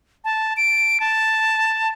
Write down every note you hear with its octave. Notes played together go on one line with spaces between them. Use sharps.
A5
D7
A5